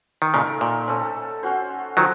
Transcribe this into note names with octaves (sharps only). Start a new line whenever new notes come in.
D#3
A#2 C#3 A3 D#4 A#4
A#2
C#4 A4 C5
C#4 F#4 C5
D#3 F3 F#3